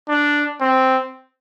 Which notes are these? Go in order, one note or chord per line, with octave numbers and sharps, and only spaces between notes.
D4
C4